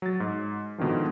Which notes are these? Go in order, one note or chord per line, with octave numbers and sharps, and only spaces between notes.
F#3 A6
G#2
G#2 B2 D3 D#3 F3